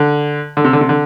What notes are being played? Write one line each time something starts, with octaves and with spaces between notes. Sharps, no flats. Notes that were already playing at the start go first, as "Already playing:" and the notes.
Already playing: D3
D3
C3
D3
C3
D3